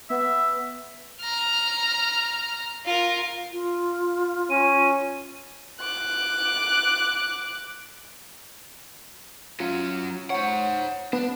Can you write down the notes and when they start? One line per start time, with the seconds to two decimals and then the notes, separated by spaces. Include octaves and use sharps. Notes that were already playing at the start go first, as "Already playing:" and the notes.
0.10 B3 E5
1.21 A#5 F6
2.86 F4 A#4
3.52 F4
4.50 C#4 D#7
5.81 D6 F#6
9.60 F#3 C#4 F4
10.30 C5 C#5 F#5
11.13 B3 D4